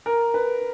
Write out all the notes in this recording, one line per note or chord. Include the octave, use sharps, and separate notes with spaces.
A#4
B4